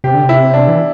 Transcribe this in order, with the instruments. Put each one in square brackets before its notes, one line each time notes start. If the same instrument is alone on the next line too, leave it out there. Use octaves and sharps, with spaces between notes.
[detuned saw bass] C3 [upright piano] G4
[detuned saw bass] D3
C3
[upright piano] E4
D4
[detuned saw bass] E3